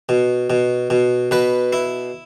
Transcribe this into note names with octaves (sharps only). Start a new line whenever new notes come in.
B2
B2
B2
B2 B4
E4